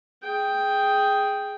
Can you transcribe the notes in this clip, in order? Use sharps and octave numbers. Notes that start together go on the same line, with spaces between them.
G#4 G5